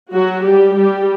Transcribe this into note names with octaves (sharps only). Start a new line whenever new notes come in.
F#3 F#4
G3 G4
G3 G4